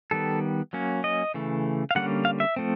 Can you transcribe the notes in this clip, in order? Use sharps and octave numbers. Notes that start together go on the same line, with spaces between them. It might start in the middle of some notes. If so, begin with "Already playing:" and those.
D#3 G3 B3 A4
F#3 A#3 C#4
D#5
C#3 E3 A3
F5
D3 G3 A#3 C#4 F#5
F5
E5
F3 A3 C4